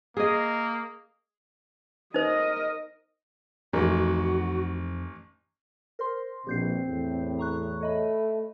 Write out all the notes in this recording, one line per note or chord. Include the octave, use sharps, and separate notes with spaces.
A#3 G#4 D#5
D#4 A#4 C5 D#5
A1 F2 D#4 F#4 A#4
A#4 C5 C6
A#1 B2 C4 G4 G6 C7
E2 A2
A#5 C#6 F#6
A3 C#5 D#5 B5